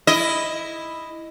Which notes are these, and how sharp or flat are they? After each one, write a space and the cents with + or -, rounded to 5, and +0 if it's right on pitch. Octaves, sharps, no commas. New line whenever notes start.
E4 +0 D#5 +0